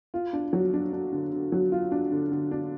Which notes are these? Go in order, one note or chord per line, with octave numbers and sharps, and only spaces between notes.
F4
D4
F#3
D4
D4
D3
D3
F#3
F4
D4
D3
D3
D4